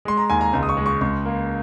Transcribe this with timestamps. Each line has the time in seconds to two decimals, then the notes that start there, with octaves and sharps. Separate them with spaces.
0.05 G#3 C6
0.17 A#5
0.30 D#2 G#5
0.41 A#5
0.53 C#2
0.63 D#6
0.69 C#6
0.77 G#3
0.86 C#6
1.01 C#2 C#6
1.25 A#3